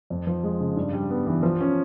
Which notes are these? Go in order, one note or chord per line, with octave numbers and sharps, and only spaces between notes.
F2
F3
G#3
C#3
G2
G3
B3
E3
F3
C#4